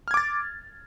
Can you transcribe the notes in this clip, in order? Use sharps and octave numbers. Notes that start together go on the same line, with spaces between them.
D6 F6 G#6 A6